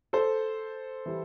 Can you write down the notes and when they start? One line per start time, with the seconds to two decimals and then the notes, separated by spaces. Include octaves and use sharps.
0.13 A4 C5
1.06 E3 G3